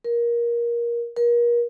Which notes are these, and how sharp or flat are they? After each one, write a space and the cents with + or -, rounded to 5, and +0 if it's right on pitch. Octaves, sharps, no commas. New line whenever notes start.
A#4 +20
A#4 +35